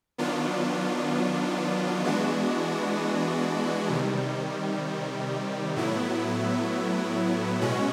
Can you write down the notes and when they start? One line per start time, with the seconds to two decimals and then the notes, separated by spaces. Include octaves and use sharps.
0.18 D#3 F#3 B3 D4 F4
2.04 E3 G#3 B3 D4 F#4
3.90 C3 D#3 G3
5.76 A2 F#3 B3 E4
7.61 B2 G#3 C#4 F#4